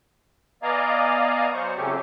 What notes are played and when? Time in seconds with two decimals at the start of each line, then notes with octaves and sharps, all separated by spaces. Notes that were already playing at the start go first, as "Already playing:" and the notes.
0.63 B3 D5 D#5 F5 G#5 A#5
1.54 F#3 C5 C#6
1.77 F2 C#3 F#3 A3 C#4 G4